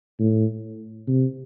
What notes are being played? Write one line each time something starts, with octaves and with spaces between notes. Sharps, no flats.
A2
C3